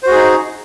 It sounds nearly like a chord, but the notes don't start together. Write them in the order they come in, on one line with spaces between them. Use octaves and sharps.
C5 F#4 G#4 D#4